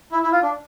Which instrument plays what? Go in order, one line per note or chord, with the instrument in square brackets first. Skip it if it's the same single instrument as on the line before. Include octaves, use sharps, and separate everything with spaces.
[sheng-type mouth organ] E4
E4
F4
D4